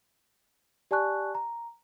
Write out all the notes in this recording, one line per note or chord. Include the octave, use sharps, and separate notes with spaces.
G4 D5 G#5 A5 C#6 F#6
A#5